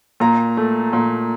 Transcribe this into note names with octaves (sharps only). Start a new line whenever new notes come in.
A#2 A#5
A3
A#2